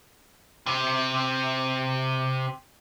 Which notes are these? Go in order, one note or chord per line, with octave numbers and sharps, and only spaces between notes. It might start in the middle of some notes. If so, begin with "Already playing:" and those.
C3 C4